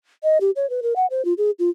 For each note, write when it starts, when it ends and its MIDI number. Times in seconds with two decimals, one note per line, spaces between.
0.23 0.38 75
0.41 0.51 67
0.56 0.69 73
0.70 0.81 71
0.83 0.93 70
0.96 1.06 78
1.10 1.24 72
1.25 1.33 65
1.38 1.51 68
1.59 1.70 65